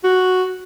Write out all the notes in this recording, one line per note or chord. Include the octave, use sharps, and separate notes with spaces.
F#4